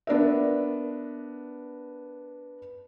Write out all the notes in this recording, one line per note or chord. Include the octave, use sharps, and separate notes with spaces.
B3 D4 A#4 E5